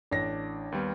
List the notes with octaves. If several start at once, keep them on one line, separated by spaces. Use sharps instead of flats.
A1 D4 A#6
D#2 G3 B3